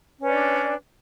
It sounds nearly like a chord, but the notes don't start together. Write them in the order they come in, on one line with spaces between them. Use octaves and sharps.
C#4 B4 D5 D4